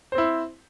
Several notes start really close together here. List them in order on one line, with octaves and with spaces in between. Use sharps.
C5 C4 E4